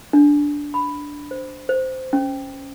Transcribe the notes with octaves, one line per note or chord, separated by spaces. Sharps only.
D4
B5
C5
C5
C#4